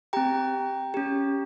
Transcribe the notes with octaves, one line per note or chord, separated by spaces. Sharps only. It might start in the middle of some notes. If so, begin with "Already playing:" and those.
C4 G4 G5 A#5
C#4 G4